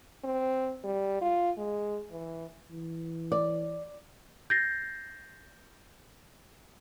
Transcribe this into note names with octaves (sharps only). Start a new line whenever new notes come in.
C4
G3
F4
G#3
E3
E3
D5
G6 A6 A#6 C7